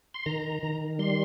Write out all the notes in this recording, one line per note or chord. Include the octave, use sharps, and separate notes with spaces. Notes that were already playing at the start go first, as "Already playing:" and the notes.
C6
D#3 A#5
D#3
G3 C6